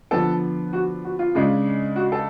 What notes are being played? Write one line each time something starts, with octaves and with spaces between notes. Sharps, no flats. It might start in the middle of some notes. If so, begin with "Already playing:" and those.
D3 F3 B3 A4
F#4
F#4
F4
C#3 G#3 D4
F#4
A4